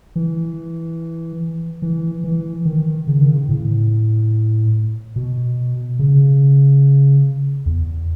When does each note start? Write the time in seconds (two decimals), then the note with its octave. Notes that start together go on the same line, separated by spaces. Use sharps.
0.16 E3
1.82 E3
2.24 E3
2.65 D#3
3.07 C#3
3.21 D#3
3.35 C#3
3.49 A2
5.16 B2
5.99 C#3
7.66 E2